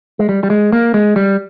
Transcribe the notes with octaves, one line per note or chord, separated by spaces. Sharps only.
G#3
G3
G3
G#3
A#3
G#3
G3